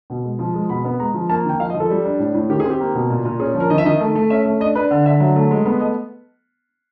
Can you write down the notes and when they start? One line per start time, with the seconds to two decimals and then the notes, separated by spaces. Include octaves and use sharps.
0.10 B2
0.24 G#3
0.39 F3
0.54 G#3
0.69 B2 B5
0.85 B3
1.00 G#3 A#5
1.14 F3
1.29 A#3 A5
1.45 D#3 G5
1.59 F3 F5
1.70 D#5
1.74 F3
1.80 A4
1.90 G3
2.04 D4
2.19 A2
2.34 A2
2.49 D#3 G4
2.60 G#4
2.65 C4
2.70 G4
2.80 A#3
2.95 B2
3.10 A#2
3.25 A#2
3.39 C#4 G#4
3.55 F3
3.60 A#4
3.70 D#3 D#5
3.78 E5
3.85 D#3 D#5
4.00 A3
4.15 A3
4.30 C#4 E5
4.45 A3
4.60 D4 D#5
4.75 D4 B4
4.91 D3
5.06 D3 E5
5.20 F#3
5.36 A3
5.51 G#3
5.65 B3
5.80 A3 D#5